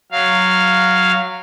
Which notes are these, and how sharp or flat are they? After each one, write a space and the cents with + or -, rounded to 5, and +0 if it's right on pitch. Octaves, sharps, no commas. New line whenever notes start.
F#3 +0 F5 -5